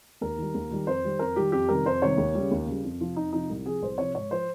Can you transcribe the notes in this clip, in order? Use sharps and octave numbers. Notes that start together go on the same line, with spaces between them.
D#2 A#4
D#3 G3
D#2
D#3 G3
F2 C5
D#3 G3
F2 A#4
D#3 G3 G4
F2 G4
C3 D#3 G3 A#4
F2 C5
C3 D#3 G3 C#5
D#2
C#3 G3
D#2
C#3 G3
F2
C3 F3
F2 D#4
C3 F3 D#4
C2
C3 F3 G#4
C2 C5
C3 F3 C#5
G#2 C#5
F3 C5